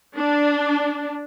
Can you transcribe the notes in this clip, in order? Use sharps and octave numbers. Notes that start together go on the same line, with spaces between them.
D4